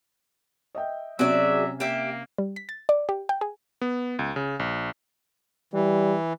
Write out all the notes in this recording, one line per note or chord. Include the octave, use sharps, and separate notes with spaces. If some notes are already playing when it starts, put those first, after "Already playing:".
D#5 E5 G5
C3 F#3 C#4 F#4 G#4 D5 E5
A#3 G4 E5
G3
B6
A6
D5
G4
G5
G#4
B3
C#2
C#3
A#1
E3 G3